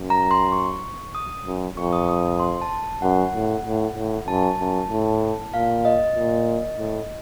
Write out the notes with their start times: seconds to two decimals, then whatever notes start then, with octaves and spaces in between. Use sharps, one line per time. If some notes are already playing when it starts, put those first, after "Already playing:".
Already playing: F#2
0.10 A#5
0.31 C6
0.52 C#6
1.15 D#6
1.46 F#2
1.77 F2 C#6
1.93 D#6
2.09 D#6
2.40 C6
2.62 A5
3.02 F#2 F#5
3.35 A2
3.65 A2
3.96 A2
4.28 F#2 A5
4.59 F#2
4.90 A2
5.53 A#2 F5
5.85 D#5
6.16 A#2
6.79 A2